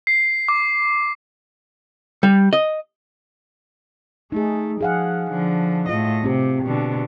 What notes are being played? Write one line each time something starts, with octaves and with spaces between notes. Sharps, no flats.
C7
D6
G3
D#5
A3 D#4 G#4
F3 G#4 F5 F#5
D3 F3
A2 F4 D#5
C3 C4 G4
B2 D3